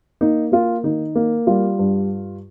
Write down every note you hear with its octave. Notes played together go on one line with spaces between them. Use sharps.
A#3 D#4
A#3 F4
D#3 D#4
A#3
G3 F4
G2